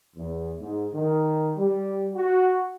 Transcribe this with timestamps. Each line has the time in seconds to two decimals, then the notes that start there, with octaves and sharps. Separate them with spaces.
0.16 E2
0.60 G#2
0.93 D#3
1.57 G3
2.15 F#4